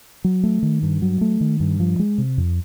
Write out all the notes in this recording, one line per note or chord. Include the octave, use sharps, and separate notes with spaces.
F#3
A3
D#3
G2
F#3
A3
D#3
G2
F3
G#3
C3
F2